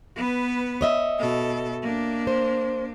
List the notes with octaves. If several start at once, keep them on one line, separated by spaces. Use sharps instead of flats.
B3 B4
C#5 D#5 E5
B2 A4
A#3 D4
C5